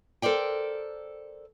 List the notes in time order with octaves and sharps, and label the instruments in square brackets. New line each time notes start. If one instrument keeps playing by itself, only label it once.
[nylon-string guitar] A4 A#4 C5 D5 G5